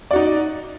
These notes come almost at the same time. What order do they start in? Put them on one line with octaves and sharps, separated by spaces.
D5 F#4 D#4